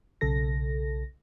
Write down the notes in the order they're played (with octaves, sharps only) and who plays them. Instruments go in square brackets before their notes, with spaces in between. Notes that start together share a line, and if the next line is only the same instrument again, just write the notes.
[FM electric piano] B1 C#3 A4 A#6